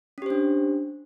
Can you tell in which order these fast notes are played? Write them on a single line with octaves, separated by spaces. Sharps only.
C#4 G4 C5 D4